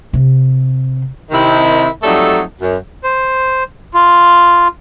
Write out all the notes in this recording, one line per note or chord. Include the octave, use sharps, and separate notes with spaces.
C3
C3 D#3 E4
F2 F#3 G3 A3 D#4 A4
F#2
C5
F4